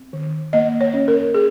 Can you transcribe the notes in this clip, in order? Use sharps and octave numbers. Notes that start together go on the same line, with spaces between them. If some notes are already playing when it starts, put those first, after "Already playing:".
Already playing: C4
D#3
A#3 D#5
C#5
C#4
A#4
G#4